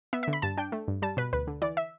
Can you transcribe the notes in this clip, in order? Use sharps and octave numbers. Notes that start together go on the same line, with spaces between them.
B3 E5
D3 E5
B5
G2 A5
D4 G5
A3
G2
G3 A5
B2 B4
D2 B4
D3
E3 D5
E5